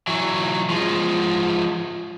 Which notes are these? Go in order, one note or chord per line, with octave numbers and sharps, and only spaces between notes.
E3 F#3
F3 G#3